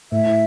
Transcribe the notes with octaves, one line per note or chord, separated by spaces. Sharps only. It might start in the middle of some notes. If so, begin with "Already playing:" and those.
A2 E5
E4